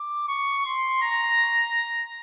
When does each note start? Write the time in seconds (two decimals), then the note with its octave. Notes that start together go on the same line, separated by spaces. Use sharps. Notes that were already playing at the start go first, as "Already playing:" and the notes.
Already playing: D6
0.29 C#6
0.66 C6
1.02 A#5